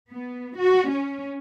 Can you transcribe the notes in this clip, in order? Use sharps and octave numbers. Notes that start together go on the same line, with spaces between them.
B3
F#4
C#4